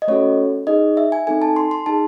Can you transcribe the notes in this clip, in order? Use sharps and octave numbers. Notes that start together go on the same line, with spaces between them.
D#5
A3 C#4 F#4 A4 C#5
D#4 G#4 D#5
E5
G#5
C4 D#4 A4 G#5
A5
C6
C6
D#4 G#4 A5